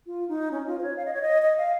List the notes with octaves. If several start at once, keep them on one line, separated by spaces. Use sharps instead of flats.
F4
D#4
C#4
F4
C5
C#5
F5
D#5
C#5
D#5
D#5
F5